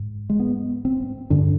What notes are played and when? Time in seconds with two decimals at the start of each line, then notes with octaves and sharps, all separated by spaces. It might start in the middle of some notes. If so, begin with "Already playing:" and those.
Already playing: G#2
0.30 G#3
0.39 B3
0.85 C4
1.30 G2 D3 D4